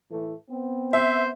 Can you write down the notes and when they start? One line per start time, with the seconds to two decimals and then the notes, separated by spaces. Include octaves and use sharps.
0.10 A2 E3 A3
0.49 B3 C4
0.93 C5 E5